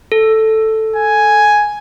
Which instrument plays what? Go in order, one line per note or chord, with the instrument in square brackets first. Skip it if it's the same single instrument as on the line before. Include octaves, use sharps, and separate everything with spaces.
[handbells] A4
[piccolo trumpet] G#5